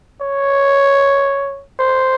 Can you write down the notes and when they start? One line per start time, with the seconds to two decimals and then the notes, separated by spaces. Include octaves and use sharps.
0.21 C#5
1.79 C5